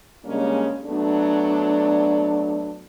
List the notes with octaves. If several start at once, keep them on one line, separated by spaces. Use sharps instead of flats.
C#3 G3 G#3 A#3 C#4 D4
F#3 A3 B3 D4